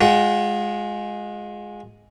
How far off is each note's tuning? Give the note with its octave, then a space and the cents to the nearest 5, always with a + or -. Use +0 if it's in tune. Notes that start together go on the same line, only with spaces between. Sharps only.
G#3 +0 F4 +35 F#5 +40